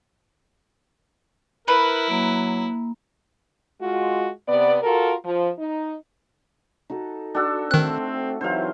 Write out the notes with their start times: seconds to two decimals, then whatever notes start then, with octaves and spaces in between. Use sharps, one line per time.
1.68 E4 A#4 B4
2.10 F#3 A#3
3.81 G#3 F4 F#4
4.48 C3 B3 D5
4.82 F4 F#4 A4 A#4
5.25 F3
5.59 D#4
6.90 D#4 F#4 A4
7.35 D4 F#4 A4 D#5
7.71 D#3 A3 C4 F#6
8.41 E3 F#3 C4 D#4 E4 G4 C5 F5